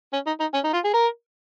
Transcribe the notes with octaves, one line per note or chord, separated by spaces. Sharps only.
C#4
D#4
D#4
C#4
D#4
F4
G#4
A#4